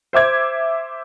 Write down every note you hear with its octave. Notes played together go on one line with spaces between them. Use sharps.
C5 E5 D6 G#6